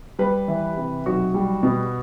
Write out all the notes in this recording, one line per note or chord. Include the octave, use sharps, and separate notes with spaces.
G3 B4
E3
C3
B1 F#4
G3
B2